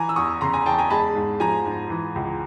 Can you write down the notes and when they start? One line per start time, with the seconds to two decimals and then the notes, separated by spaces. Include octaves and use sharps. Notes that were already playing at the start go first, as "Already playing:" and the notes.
Already playing: E3 G#5 A#5
0.09 E6
0.16 E2 C#6 D#6
0.41 C#3 A#5 C6
0.53 G#5 A#5
0.66 E2 G5 A5
0.78 G#5 A#5
0.90 G#3 A5 B5
1.15 G#2
1.40 F3 G#5 A#5
1.66 G#2
1.90 E3
2.16 C#2